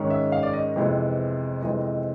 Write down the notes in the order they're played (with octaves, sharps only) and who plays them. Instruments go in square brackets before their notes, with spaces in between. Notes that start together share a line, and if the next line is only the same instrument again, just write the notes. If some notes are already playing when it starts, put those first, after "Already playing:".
Already playing: [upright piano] G#2 D#3 G#3 C#4
E5
F5
D5
D#5
F2 C3 E3 G#3 B3
F2 C3 E3 G#3 B3 D#5
D#5